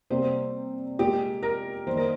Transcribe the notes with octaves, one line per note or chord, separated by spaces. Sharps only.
C3 G3 A#3 C5
A#2 G#3 G4
A#4
D#3 G3 A#3 C5
A#4